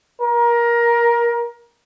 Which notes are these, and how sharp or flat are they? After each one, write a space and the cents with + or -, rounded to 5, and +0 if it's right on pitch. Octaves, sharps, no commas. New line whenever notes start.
A#4 +20